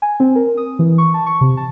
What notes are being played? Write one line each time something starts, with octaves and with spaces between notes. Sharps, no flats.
G#5
C4
A#4
D#6
E3
C#6
A5
C#6
C3
A5